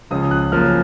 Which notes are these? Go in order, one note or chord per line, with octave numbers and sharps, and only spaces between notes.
C#2 C#3 F3 D#6
F#6
F#2 C#3 F3 A#3 F6